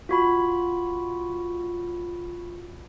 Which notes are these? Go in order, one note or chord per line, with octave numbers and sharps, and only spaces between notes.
F4 F#4 B5